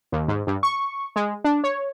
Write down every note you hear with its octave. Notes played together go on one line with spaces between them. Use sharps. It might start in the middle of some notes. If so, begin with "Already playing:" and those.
D#2
G#2
G2
C#6
G#3
D4
C#5